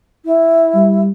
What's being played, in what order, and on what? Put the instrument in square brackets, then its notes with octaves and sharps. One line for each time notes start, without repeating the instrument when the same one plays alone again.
[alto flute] E4
[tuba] G3